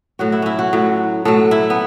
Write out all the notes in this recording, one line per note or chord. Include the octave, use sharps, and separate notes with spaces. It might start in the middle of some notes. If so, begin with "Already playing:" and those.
A2 F#3 F#4
E4
C#4 E4
F#4
A2 F#3
A2 F#3 A4
E4
B3